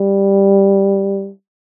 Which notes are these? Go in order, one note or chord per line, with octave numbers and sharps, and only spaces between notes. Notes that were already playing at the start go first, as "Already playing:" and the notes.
Already playing: G3